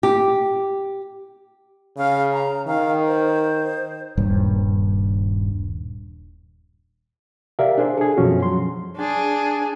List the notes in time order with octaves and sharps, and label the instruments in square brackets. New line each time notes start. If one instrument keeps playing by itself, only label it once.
[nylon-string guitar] G4
[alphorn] C#3 [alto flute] F5
[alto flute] A#5
[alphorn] D#3 [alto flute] F5
[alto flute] C5
[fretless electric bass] D#1 G2
[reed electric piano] G4 A#4 D5 E5 F5
D4 G#4 C5
G#4 A4
F#2 B2 F3 C#4 F#4
F#3 C6
[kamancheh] D4 G#4